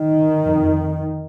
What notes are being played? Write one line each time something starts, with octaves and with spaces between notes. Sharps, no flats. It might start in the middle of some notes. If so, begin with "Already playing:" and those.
Already playing: D#3
F2